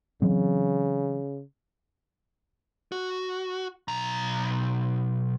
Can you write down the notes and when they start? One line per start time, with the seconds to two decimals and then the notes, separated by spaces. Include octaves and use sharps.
0.22 C#3 E3 F#3 C4
2.92 F#4
3.88 B1 A#5